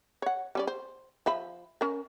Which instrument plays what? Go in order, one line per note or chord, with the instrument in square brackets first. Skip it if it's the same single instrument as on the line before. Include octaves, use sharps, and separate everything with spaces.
[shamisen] C#5 F#5
G3 C#4 D5
C5
F3 E5 B5
C#4 A#4